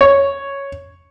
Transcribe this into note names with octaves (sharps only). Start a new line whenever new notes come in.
C#5